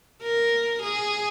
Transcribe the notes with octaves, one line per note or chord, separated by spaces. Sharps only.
A#4
G#4